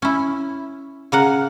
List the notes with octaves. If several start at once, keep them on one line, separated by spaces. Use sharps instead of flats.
C#4 E4
C#3 A#4 F#5